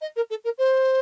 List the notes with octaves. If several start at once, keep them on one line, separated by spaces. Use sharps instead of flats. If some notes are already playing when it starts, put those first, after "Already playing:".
D#5
A#4
A4
A#4
C5